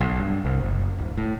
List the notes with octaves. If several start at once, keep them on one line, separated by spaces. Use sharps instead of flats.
B1
G2
C2
F#1
D1
A2